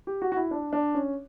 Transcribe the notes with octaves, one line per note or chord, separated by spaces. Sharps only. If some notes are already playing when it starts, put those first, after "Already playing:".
G4
F#4
F#4
E4
D4
D4
C#4